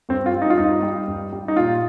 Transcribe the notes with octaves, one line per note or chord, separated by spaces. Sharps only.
G2 C4
F4
G3
D#4
F4
G2 D#4
G3
G2
G3
D#4
A#2 F4